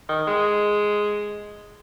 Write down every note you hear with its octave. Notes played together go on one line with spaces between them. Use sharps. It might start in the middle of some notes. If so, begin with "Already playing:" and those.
D#3
G#3